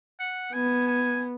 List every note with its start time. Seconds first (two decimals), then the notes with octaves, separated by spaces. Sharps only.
0.19 F#5
0.53 B3 G#5
0.87 G#5